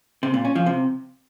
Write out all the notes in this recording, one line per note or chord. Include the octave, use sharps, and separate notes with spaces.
C3
A#2
C#4
F3
C3